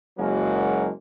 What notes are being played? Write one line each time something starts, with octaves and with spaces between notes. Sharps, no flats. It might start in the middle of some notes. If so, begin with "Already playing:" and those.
F#1 F#3 G#3 A#3 F#4